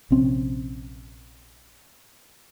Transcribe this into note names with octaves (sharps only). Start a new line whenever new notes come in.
A#1 C3 C4 C#4